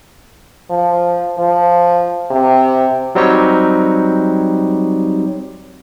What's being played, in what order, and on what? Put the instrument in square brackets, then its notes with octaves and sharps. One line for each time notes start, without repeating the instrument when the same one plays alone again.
[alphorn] F3
F3
C3
[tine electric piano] F#3 G3 C4 D#4 G4 C#5